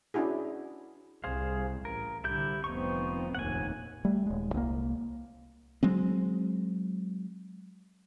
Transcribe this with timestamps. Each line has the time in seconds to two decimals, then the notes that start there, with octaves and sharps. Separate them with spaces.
0.14 C#4 D4 E4 F#4 G#4
1.24 C2 G#4 C5 F5
1.85 A1 A#4
2.24 C2 D3 E4 G4 G6
2.64 F1 F3 B3 C4 D#4 C#6
3.35 F1 A#1 D#2 F#5 G#5
4.05 G3 A3
4.26 D#1 G#3
4.54 C2 A#3
5.83 F#3 G#3 C4